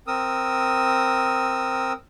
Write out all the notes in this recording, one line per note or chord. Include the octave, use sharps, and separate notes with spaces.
C4 A#4 D#6 E6